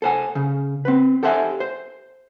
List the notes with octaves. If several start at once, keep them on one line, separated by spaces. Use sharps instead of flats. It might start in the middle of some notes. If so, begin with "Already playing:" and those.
A4 C5 G#5
C#3
C4 B4
G4 A4 C5 E5 F#5 G#5
C5